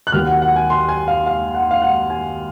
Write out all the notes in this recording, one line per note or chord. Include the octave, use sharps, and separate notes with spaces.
F#6
D#2 D#3 F#3 A#3 F6
F#5
F#5
G#5
C6
G#5
F5
F5
F#5
F5
F#5
G#5